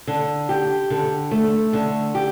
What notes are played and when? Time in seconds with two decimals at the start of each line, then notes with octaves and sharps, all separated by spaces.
0.07 D3
0.49 G4
0.90 D3
1.31 A3
1.73 D3
2.15 G4